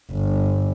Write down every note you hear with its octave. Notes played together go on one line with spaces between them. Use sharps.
G1